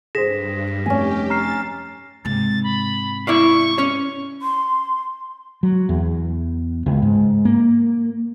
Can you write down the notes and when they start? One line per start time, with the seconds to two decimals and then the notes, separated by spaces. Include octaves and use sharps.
0.15 G2 G#4 C5 A#6 B6 E7
0.86 F1 C#4 G4 G#5
1.30 A#5 F6 A6 C7
2.25 G#2 C3 A6
2.64 B5
3.27 E4 D5 F5 C#6
3.78 C#4 C#5
4.42 C6
5.63 F#3
5.89 E2
6.86 C#2
7.02 G#2
7.45 A#3